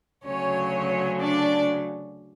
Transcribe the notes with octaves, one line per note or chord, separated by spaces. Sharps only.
D2 C#3 F#3 C#4 C#5
D4 D5